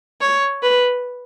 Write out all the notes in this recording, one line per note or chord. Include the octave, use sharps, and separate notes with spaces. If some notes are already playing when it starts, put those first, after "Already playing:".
C#5
B4